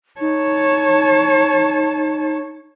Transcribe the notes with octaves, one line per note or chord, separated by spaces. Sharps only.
D#4 C#5 A5